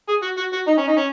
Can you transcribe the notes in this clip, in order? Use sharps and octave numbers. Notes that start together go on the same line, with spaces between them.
G#4
F#4
F#4
F#4
D#4
C#4
D#4
C#4